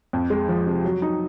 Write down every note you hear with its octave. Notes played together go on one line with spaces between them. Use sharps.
F2
G#3
F3
C3
F#3
D#4